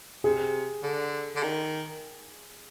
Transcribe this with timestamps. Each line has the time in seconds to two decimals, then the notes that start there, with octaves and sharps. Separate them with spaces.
0.24 C3 G#4
0.83 D3
1.35 D3
1.43 D#3